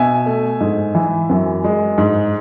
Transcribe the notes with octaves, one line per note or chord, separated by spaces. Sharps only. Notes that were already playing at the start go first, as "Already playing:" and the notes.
Already playing: B2 E5 G#5
A3
G#2
E3
F#2
G#3
G#2